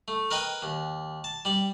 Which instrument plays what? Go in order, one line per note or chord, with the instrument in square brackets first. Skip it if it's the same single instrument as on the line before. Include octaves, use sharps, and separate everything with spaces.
[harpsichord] A3
A#4 B4 D#5 G5
D#2
A5
G3 D5